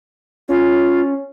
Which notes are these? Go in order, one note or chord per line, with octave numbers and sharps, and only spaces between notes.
C#4 F4